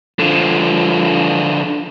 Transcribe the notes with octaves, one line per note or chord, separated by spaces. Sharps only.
D3 F3